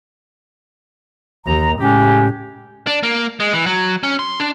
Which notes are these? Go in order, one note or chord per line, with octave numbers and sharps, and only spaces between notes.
D#2 A#5
A2 C#3 G#3 C#4 G4
D4
A#3
G#3
E3
F#3
C#4
C6
D4